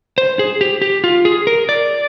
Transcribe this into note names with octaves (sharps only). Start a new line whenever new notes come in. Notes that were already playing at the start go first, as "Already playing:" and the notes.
C5
G#4
G4
G4
F4
G#4
A#4
D5